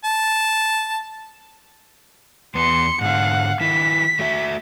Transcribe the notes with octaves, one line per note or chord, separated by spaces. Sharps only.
A5
E2 B3 C6 C#7
G#2 D3 F5 F#5
D#3 E4 B6
A3 F#4 E5